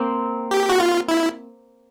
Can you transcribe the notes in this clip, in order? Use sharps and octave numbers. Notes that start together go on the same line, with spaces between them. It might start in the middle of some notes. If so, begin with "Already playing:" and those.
Already playing: A#3 C4
G4
F#4
F4
E4